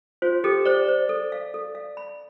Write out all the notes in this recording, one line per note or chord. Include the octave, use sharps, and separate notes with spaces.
F4 C5
G4 A4
C5 D5
C5
A4
F5
A4
F5
B5